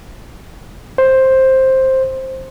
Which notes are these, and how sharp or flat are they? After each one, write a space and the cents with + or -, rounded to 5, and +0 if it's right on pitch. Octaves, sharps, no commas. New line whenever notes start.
C5 +10